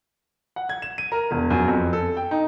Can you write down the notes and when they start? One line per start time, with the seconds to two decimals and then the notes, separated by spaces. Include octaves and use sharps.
0.56 F#5
0.69 G#6
0.82 E7
0.98 D#7
1.12 A#4
1.31 E1
1.50 F#2
1.68 F2
1.93 A4
2.17 G5
2.31 D#4